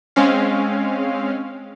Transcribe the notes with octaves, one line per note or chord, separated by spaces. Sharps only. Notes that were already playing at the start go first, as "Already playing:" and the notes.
G#3 C4 C#4 F5